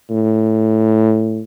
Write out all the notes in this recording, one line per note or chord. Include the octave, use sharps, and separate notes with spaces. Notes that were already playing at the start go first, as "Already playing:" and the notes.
A2